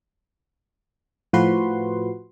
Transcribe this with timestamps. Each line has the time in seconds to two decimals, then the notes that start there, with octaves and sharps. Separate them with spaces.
1.33 A2 F3 F#4 B4 C6